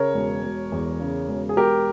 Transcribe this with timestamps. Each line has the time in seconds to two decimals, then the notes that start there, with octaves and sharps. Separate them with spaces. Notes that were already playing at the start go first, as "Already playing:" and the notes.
Already playing: C#3 A#4 C#5
0.14 E1
0.43 E1
0.72 E2
1.00 C#3
1.28 E1
1.49 G#4
1.57 E1 G4 A#4